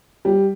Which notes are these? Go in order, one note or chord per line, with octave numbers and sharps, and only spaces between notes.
G3